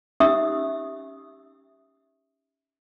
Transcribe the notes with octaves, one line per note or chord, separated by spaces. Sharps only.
C#4 D#4 G4 E5 D#6 E6